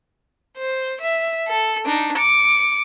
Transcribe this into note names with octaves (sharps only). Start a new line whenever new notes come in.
C5
E5
A4
D4 D#4
D6 C#7